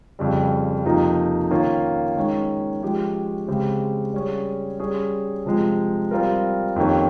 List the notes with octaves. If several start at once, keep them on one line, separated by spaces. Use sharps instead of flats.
F2 C#3 G3
F2 C3 F3 A#3 D#4
D#3 A#3 C#4 F4
D#3 G#3 C#4
F3 G#3 C#4 G4
C#3 G#3 C4 G4
G3 C#4 G#4
G3 C#4 G#4
C3 F3 G#3
G3 C4 F4 A#4
F2 D#3 A#3 C#4 G4